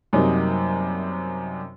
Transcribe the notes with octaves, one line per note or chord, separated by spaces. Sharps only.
F#2 C3 F#3 G3 A#3 D#4